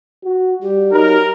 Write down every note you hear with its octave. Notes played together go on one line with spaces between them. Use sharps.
F#4
G3 G4
F#3 D#4 A#4